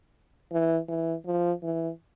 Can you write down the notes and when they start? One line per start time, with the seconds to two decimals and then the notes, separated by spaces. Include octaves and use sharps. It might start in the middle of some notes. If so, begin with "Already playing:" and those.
0.53 E3
0.88 E3
1.26 F3
1.63 E3